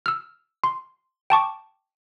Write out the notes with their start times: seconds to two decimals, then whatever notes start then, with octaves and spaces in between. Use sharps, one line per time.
0.06 E6 F6
0.64 C6
1.30 G5 A5 C#6 D6